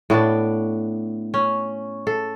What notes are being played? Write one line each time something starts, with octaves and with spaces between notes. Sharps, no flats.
A2 B3 D4 D5
C#4
A4